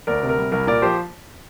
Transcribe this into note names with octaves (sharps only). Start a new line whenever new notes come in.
D2 A#4 D5
C3
A#4
G3
C2 A#4
A#2 A#4 D5
F3 G4 C5